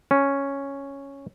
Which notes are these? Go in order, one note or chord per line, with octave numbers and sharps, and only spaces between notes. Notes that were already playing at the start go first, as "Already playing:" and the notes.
C#4